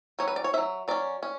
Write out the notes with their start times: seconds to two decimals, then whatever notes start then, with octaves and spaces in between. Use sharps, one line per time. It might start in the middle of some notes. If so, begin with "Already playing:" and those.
0.19 F#3 C#4 C#5
0.28 B4
0.36 D5
0.44 C#5
0.54 F#3 C#4 E5
0.88 F#3 C#4 D5
1.23 C#4